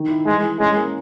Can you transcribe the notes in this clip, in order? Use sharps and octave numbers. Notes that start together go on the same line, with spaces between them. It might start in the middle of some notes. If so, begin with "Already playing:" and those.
Already playing: D#3
E4
E3 G#3
E3
G#3 C#4
A#3